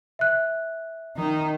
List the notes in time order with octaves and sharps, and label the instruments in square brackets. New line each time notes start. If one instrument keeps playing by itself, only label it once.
[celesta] E5 F#6
[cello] D#3 D#4